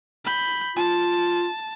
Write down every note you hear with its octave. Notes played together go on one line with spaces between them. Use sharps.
B5 G6
F4 A5